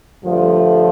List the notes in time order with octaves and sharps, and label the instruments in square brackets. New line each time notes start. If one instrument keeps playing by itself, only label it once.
[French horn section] G2 D3 F3 A3